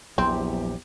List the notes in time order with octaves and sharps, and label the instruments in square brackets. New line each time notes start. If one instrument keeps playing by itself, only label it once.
[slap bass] A#1 F#3 [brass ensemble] E2 G4 [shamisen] C4